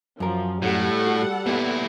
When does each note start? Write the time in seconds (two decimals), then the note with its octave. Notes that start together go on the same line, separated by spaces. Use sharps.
0.20 F#2 F3 A#4
0.62 A2 G3 A4 F#5
1.07 F#4
1.46 A#2 B3 E4 G4